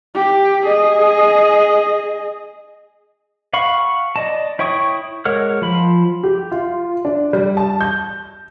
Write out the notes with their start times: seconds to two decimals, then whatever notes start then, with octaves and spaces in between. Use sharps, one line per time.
0.15 G4
0.65 G#4 D#5
3.53 F5 F#5 B5 C#6
4.16 D5 D#5 A5
4.59 E4 C#5 G5 C#6 D#6
5.25 G#3 A#4 C#5 F#5 F6
5.62 F3 B5
6.24 G4
6.52 F4
7.05 D4
7.33 G3
7.57 A5
7.81 G6